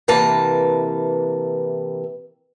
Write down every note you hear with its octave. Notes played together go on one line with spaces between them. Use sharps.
C3 E3 A#3 B4 A5 A#5